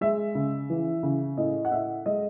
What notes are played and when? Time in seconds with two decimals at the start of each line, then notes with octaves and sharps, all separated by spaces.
0.01 G#3 E5
0.35 C#3
0.70 E3
1.03 C#3
1.37 A2 D#5
1.65 F#5
1.71 A2 E5
2.06 G#3 D#5